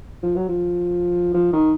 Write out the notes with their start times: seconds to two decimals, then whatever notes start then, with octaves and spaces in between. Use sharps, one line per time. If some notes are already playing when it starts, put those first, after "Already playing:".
0.23 F3
0.36 F#3
0.49 F3
1.34 F3
1.53 D#3